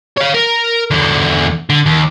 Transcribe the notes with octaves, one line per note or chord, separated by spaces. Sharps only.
C#5 F5
A#4
E2 D3
D3
D#2